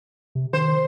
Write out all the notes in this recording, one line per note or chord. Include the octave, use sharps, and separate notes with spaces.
C3
D#3 C5